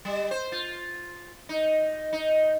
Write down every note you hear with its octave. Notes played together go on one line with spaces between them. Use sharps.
G3
C5
F4
D#4
D#4